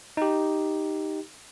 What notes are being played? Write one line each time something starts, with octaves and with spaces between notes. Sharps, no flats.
D#4 G4